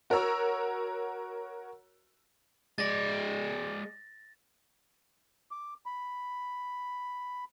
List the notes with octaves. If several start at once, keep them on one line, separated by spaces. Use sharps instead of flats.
F#4 A#4 C#5 A#5 E6
G#3 D5 A6 A#6
D6
B5